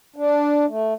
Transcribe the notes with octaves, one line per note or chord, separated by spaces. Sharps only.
D4
A3